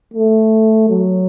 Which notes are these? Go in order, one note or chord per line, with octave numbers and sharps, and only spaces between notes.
A3
F#3